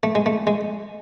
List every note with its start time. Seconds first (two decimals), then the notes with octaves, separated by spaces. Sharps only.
0.03 A3
0.15 G#3
0.26 A3
0.47 G#3